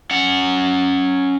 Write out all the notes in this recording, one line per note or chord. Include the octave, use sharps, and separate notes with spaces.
C#4 F#5